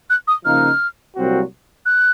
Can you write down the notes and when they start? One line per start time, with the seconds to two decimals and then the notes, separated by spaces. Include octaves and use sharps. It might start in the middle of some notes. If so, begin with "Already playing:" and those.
0.10 F#6
0.28 D#6
0.45 C#3 F3 A#3 D#4 F6
1.16 C2 A#2 F#3 C4 F#4
1.86 F#6